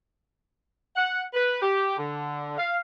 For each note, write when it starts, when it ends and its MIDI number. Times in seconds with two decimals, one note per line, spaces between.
0.96 1.23 78
1.34 1.59 71
1.61 1.93 67
1.98 2.55 50
2.58 2.76 77